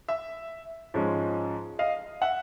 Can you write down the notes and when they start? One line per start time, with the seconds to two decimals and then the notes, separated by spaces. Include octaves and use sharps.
0.09 E5
0.94 G#2 F3 G#3 C#4
1.79 D#5 F5
2.21 E5 F#5